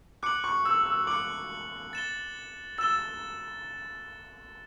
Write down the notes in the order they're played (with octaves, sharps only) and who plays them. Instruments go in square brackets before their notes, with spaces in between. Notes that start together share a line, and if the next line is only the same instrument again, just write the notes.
[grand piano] D6 [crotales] F#6 C#7 F#7
[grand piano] C#6
E6
E6
[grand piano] D6 [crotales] F#6 C#7 F#7
[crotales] A6 E7 G7
[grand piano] E6 [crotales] A6 E7 G7